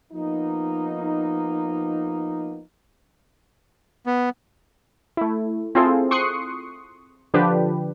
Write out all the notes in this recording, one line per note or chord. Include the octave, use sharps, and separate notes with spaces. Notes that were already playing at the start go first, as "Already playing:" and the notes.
F3 A#3 B3 D#4
B3
A3 E4
C4 E4 F4 G#4 A4 C5
C6 C#6 D#6 F#6 C7 C#7
D3 F3 D4 G4 B4